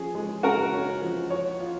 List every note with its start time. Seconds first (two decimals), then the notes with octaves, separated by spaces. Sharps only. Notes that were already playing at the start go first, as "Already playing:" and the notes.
Already playing: F3 C#4 G#4
0.15 G#3
0.43 C#3 F#4 A#4
0.73 C#4
1.02 F3
1.30 C#5
1.60 F4